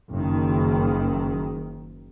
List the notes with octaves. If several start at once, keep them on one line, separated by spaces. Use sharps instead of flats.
F#1 D#3